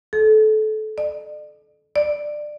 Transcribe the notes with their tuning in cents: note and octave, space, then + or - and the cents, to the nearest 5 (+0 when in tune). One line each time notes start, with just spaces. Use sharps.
A4 -25
D5 +40
D5 +20